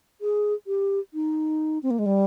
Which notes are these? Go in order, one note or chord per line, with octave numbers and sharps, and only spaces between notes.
G#4
G4
D#4
C4
A#3
G#3
G3